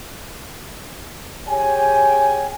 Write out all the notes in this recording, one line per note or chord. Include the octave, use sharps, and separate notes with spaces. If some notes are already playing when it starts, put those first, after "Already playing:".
G4 G#4 C#5 G5 G#5